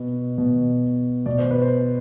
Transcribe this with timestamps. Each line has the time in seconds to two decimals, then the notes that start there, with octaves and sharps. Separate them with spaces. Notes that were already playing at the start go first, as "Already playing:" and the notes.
Already playing: B2 B4
0.38 B2
1.26 B2 D5
1.38 C5
1.51 B4
1.62 C5